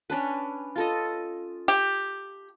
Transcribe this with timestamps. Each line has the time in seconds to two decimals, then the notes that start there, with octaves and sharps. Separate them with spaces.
0.10 C#4 D4 B4
0.76 F4 A4 D#5
1.68 G4